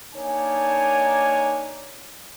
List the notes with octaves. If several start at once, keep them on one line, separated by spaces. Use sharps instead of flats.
A#3 D4 D#4 C#5 G#5